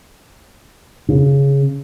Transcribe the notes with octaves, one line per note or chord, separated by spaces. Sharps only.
C#3